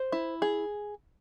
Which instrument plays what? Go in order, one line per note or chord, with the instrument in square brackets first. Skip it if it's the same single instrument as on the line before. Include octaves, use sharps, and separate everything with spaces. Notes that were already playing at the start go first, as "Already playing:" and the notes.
Already playing: [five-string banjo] C5
E4
G#4